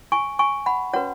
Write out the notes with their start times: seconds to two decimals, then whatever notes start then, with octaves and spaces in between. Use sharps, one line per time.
0.12 G#5 C#6
0.39 G#5 C#6
0.66 F#5 B5
0.93 C#4 F#4 B4 C#5 F#5